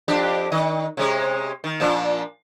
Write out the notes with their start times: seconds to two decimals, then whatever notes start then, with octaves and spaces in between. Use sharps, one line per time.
0.08 F2 D4 G4
0.52 D#3 D#5
0.97 C3 G#3 C#4
1.64 D#3
1.80 A#2 F3 D4